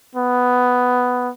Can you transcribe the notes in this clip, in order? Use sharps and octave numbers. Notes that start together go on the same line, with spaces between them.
B3